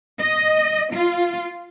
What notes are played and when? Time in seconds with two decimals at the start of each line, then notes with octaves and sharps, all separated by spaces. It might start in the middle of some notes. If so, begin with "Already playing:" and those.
0.19 D#5
0.93 F4